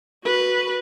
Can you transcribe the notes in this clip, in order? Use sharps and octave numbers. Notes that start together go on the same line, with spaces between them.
F#4 B4